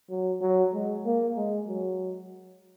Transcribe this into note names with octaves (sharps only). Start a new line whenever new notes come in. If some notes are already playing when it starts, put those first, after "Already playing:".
F#3
F#3
G#3
A#3
G#3
F#3